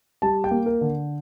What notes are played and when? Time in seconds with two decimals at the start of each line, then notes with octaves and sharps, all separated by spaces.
0.22 G3 A5
0.44 G5
0.51 A#3
0.66 A#4
0.81 D3